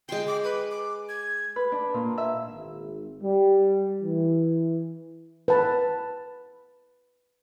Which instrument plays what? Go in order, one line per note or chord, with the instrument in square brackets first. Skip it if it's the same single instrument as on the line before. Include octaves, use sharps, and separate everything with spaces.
[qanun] G#3 C6 [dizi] G5
[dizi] D6
B4
D6
G#6
[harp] B4
D4
A#2
E5
[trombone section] G#1
G3
E3
[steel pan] B4 A5